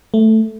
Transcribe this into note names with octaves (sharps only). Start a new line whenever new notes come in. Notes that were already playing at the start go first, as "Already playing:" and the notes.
A3